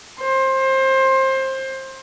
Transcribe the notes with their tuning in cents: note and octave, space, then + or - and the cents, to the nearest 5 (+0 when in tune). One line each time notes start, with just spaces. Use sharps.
C5 +25